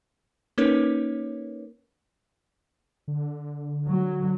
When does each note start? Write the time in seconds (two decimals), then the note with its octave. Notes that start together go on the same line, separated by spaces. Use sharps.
0.58 A#3 C#4 D#4 A#4 B4 C#5
3.08 D3
3.86 F#3